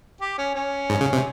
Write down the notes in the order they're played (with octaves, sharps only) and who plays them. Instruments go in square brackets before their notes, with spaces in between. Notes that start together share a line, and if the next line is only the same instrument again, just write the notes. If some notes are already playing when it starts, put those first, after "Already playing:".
[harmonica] G4
C#4
C#4
[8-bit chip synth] G#2
C#3
C3